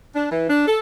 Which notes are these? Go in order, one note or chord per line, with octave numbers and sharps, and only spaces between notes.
D4
E3
D4
A4